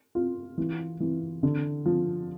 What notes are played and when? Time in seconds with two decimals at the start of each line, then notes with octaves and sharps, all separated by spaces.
0.15 F4
0.58 E3
1.00 E3
1.43 D3
1.86 F3